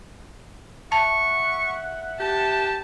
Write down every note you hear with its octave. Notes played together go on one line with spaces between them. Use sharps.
E5 F#5 A5 C#6
G4 A5